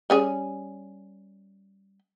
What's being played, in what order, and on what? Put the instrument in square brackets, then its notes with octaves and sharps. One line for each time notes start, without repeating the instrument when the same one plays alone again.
[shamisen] G3 C#4 G#4